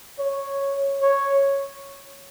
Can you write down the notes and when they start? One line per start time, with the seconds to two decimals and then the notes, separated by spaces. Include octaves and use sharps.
0.19 C#5
1.02 C#5